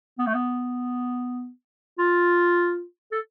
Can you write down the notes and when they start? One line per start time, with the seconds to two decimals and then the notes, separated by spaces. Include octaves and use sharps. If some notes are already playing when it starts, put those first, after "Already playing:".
0.19 B3
0.27 A3
0.34 B3
1.99 F4
3.12 A4